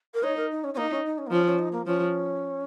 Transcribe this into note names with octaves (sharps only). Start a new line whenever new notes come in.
A#4
D#4 C#5
A#4
D#4
C#4
C#4
A#3 D#4
C#4
D#4
C#4
A#3
F3 C#4
C#4
D#4
A#3
F3 C#4